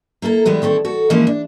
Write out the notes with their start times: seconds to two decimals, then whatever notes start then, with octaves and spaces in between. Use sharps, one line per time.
0.22 A#3 E4 A4 A#4
0.45 E3 G3 G#3 B3
0.62 D#3 C4 A4 C#5
0.85 F#4 A4
1.10 E3 F3 G#3 A#3 C#4 D#4
1.27 D4